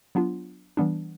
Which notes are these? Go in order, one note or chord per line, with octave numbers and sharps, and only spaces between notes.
F#3 B3 D4 F4
E3 G3 B3 D4